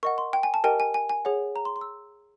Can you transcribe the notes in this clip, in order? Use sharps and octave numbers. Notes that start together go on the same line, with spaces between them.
A#4 D#5 F#5 C#6
C6
G5
G#5
A5
G4 A#4 D#5 G5 G#5
G#5
G#5
G#5
G#4 C#5 F#5
A#5
C6
C6
E6